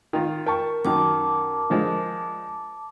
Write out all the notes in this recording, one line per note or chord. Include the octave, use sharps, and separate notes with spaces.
D#3 F4
A#4 G5 A5 C#6
F#2 D#3 A5 D6
D3 F3 G#3